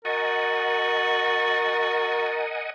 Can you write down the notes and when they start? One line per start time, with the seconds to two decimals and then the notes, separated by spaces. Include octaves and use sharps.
0.05 F#4 A#4 D#5 F#5 G#5 A6